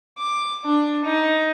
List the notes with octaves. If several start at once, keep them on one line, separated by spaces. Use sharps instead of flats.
D6
D4
D#4